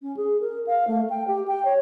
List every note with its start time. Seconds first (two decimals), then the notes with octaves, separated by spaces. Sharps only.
0.02 C#4
0.17 G#4
0.41 A#4
0.67 F5
0.88 A3
1.10 G5
1.28 G4
1.48 G5
1.65 C#5